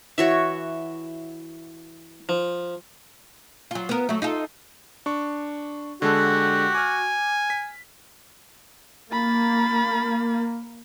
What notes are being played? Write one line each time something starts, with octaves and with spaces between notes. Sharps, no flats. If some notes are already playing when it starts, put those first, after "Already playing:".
E3 F#4 C#5 E5
F3
F#3 F4
B3 A#4
F#3 A3
D#4 F4 A4
D4 C#6
D3 G#3 F#4 G4 A4
G#5 D6 F6
B6
A#3 B5 A6